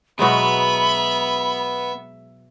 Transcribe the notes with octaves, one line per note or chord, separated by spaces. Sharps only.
B2 F#3 G#3 B3 E5 B5